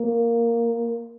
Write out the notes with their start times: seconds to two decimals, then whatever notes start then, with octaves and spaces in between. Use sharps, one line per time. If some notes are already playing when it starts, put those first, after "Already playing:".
Already playing: A#3